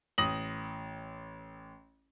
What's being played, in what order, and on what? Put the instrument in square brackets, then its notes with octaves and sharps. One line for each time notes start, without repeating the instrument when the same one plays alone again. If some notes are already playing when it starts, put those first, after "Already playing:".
[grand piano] A1 D#6 A#6 F#7